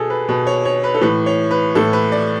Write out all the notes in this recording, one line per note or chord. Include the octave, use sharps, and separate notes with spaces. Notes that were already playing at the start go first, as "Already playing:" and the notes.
Already playing: B2 G#4 A4
B4
B2 B4
C#5
C#5
B4
A4
A2 E3 B4
C#5
B4
A2 E3 A4
B4
D5